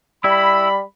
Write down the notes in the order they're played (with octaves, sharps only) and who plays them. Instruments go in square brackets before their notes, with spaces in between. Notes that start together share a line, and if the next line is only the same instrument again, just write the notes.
[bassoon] G3 [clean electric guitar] E4 [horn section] B5